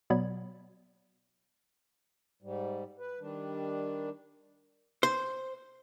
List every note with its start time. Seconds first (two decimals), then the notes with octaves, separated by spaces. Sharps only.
0.10 B2 F#3 B3 D5 B5 G#6
2.43 G#2 G3
2.98 B4
3.20 D#3 G3 D4
5.03 C5